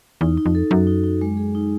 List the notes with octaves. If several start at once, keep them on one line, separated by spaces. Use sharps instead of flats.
E2 D#4
D#4
F2
A4
F#2 F#4
D#4
D#4
G#3
G#4
D#4